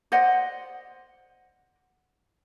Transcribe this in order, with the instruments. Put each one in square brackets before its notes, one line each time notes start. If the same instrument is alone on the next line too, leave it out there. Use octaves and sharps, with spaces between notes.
[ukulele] C5 D5 D#5 F#5